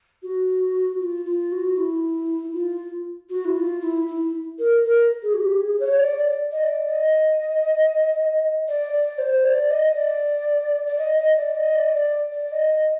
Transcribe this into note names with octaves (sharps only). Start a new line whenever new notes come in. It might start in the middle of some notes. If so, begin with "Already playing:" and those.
F#4
F4
F4
F#4
E4
F4
F#4
E4
F4
E4
E4
A#4
A#4
G#4
F#4
G4
G#4
C#5
D5
D5
D#5
D5
D#5
D5
D5
C5
D5
D#5
D5
D5
D#5
D#5
D5
D#5
D5
D5
D5
D#5